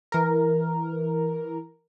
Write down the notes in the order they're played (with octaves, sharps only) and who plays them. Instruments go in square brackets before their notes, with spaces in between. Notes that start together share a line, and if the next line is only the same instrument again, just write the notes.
[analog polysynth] E3 A#4